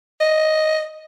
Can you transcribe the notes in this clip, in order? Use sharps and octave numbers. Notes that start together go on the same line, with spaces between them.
D#5